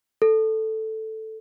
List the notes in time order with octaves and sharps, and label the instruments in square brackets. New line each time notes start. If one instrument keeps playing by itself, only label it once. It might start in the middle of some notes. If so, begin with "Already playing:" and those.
[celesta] A4